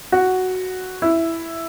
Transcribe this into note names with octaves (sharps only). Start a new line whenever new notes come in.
F#4
E4